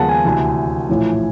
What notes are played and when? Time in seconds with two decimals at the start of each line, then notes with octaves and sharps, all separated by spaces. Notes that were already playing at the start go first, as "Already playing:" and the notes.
Already playing: D#2 C#3 F3 G#3 B3 F#5 A5
0.09 G#5
0.25 D2 C3 E3
0.90 A#1 A2 E3